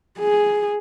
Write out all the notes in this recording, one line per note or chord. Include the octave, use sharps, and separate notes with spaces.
G#4